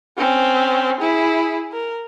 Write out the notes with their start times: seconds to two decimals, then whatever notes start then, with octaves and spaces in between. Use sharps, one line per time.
0.18 C4 C#4
1.00 E4 G#4
1.72 A#4